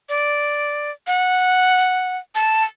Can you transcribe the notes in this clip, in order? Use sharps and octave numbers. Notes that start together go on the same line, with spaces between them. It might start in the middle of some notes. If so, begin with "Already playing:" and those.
D5
F#5
A5